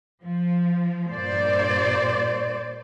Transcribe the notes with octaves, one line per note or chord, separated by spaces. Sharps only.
F3
G2 A#2 C5 D5